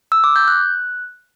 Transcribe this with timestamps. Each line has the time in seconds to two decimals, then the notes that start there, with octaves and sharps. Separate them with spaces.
0.12 E6
0.24 D6
0.36 G6
0.48 F#6